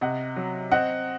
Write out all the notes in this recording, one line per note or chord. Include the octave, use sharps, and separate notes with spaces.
C3 D#5 F#5
F#3
C4 D#5 F#5